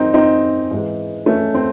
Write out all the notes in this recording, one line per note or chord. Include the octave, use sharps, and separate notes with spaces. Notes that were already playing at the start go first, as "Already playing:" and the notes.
Already playing: F#2 D#3 G#3 C4 D#4
C4 D#4
G#2 E3 G#3
A3 C#4
C4